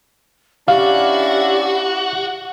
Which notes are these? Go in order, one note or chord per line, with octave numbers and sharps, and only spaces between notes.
C#4 D4 E4 F#4 G4 F5